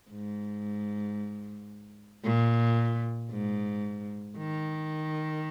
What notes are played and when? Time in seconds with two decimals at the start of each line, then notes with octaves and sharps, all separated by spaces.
0.10 G#2
2.24 A#2
3.31 G#2
4.37 D#3